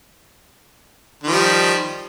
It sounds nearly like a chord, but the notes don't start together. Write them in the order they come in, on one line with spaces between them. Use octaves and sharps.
D#3 F3 G3